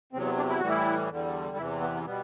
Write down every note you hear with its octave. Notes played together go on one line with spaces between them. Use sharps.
E2 C3 F#3 C4
B3
D4
E4
A2 E3 G3 F#4
E4
E2 D3 G3
E2 C3 E3 E4
B3
B3
B2 G3 B3